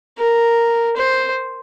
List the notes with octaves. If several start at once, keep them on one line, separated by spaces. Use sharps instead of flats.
A#4
C5